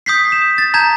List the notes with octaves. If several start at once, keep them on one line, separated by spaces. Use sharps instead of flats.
D#6 G6 B6 C7
E7
A6
A5 A#5 G6 G#6 E7